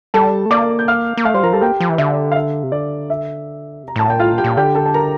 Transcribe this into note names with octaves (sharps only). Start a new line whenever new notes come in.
G3 A4 A5
A3
A#3 D5 D6
G6
F5 F6
A#3
A3 F5 F6
G3 C5 C6
F3 A#4 A#5
G3 A4 A5
A#3 G4 G5
F3
E3
D3 E5
F5
E5
C3
D3 D5
E5
C3 A#5
A2 A5
A#2 G5
A2 F4 F5
A#2
G4 G5
A#2
D3 G4 G5
A4 A5
A5
A#4 A#5